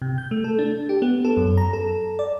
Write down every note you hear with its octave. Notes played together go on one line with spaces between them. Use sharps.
C3
G6
A3
A4
D4
G4
B3
A4
F#2
A#5
A4
D5